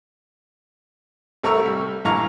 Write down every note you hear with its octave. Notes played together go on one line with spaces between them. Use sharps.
C2 A3 A#4 A#5 C#6 E6
G3
A#1 G2 E3 F5 A#5 C#6